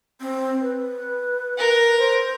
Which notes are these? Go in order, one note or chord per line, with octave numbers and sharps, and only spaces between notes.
C4
B4
A#4
C5